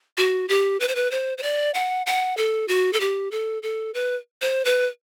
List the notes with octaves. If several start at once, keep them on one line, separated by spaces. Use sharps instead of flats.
F#4
G4
B4
C5
B4
C5
C5
D5
F#5
F#5
A4
F#4
A4
G4
A4
A4
B4
C5
B4